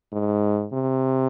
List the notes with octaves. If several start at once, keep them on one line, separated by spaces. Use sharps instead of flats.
G#2
C3